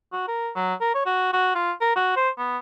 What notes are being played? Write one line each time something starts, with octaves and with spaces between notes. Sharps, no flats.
F#4
A#4
F#3
A#4
C#5
F#4
F#4
F4
A#4
F#4
C5
B3